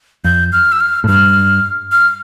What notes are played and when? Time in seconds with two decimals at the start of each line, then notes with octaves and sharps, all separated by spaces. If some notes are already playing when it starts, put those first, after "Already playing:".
0.24 F2 G6
0.52 F6
0.72 E6
0.80 F6
1.04 A2
1.08 G2 F6
1.92 F6